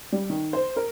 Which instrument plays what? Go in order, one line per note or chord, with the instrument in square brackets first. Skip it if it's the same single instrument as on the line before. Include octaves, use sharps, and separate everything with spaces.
[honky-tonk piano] G3
D#3
C5
A#4